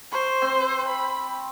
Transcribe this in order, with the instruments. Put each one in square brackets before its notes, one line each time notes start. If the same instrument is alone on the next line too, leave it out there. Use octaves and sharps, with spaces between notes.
[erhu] C5 [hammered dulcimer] C#6
[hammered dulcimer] C4
[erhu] B5